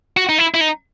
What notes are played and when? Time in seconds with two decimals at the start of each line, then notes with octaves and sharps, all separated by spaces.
0.17 F#4
0.29 D#4
0.38 E4
0.54 E4
0.61 D#4